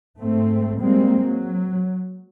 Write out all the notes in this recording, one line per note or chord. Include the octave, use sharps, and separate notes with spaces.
G#2 A3 C4
G3 G#3 A#3 C4
F#3